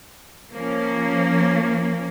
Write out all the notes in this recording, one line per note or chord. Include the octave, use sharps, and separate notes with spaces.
F3 A#3 C#4